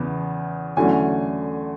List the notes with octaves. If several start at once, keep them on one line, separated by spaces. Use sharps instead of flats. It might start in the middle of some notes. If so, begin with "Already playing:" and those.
Already playing: E2 C#3 E3 B3
E2 D3 F#3 A3 C#4 G#5